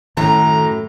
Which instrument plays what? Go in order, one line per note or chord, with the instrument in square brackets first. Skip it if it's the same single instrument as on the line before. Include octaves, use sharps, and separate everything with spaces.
[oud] F#2 A3 [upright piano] A2 [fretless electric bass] D#3 C#4 [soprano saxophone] A#5